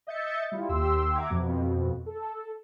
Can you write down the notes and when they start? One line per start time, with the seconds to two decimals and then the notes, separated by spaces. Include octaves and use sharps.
0.07 D#5 E5 G6 A6 C#7
0.52 G3 E4 F4
0.69 D#2 G4 C6 E6
1.16 E5 F#5 A#5 D6 G#6
1.30 F2 B2
2.06 A4